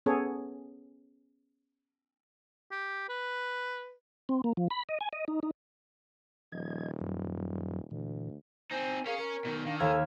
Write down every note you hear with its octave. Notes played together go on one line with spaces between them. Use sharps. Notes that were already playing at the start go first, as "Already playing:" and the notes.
B3 C#4 G#4 A4 C#5
G4
B4
C4
A#3
F3
B5
D#5
G#5
D#5
D#4
D#4
D#1 F3 D#5 G#6
F#2 F#3
D2 A#2 E3 A3
C4 D#4 C5 G#5
C#4 G#4 A#4 C#5 F5
A#4 C#7
B2 D#3
D#3 D4 F5
D#2 A4 F5 G#5 E6 G#6